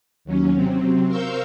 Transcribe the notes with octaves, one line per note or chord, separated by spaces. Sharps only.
D#2 F#3 C#4
C3 F#3 C4
A#4 C5 F5 C#6 E6 G6